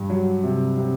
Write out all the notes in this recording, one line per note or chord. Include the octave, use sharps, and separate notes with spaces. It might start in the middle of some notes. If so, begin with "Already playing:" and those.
Already playing: G2
F#3
C3
C3